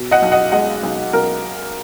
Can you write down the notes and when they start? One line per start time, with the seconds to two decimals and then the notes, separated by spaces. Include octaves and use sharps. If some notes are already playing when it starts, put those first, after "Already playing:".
Already playing: B2
0.11 D#5 F#5
0.22 B1
0.32 D#5 F#5
0.52 G#3 D#5 F#5
0.83 B1
1.13 B1 A#4